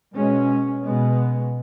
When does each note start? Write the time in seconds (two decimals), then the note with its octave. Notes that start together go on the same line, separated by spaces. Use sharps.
0.14 B2 G#3 C#4
0.83 B2 G#3 B3